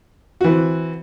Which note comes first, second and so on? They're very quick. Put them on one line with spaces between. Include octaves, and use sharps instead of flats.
F#4 E3 C4